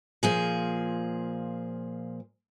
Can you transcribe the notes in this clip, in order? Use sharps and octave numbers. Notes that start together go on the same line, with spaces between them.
A#2 F3 G#4